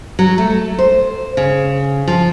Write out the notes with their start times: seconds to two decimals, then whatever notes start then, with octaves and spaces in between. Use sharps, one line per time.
0.19 F#3
0.38 A3
0.78 C5
1.37 C#3
2.08 F3